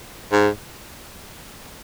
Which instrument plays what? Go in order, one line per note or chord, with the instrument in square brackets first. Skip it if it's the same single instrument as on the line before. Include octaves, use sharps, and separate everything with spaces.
[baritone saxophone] G#2